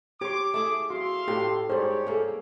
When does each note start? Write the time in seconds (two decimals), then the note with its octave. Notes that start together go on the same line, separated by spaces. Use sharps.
0.21 G4 C#5 C6 D6
0.54 A3 E4 G#4
0.90 F#4 E5 F5 C6
1.28 A2 G4
1.70 G#2 G3 G4 G#4 C5 C#5
2.07 A#3 G#4 A4 G5